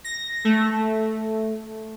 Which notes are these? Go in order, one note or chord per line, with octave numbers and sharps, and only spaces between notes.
A#6
A3